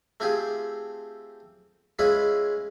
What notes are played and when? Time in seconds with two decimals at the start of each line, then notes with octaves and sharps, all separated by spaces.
0.20 A3 C4 F4 G4 G#4
1.99 G#3 C#4 E4 F4 G#4 B4